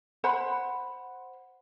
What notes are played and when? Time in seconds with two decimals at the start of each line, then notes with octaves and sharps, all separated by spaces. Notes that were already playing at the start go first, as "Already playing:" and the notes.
0.24 C5 F#5 B5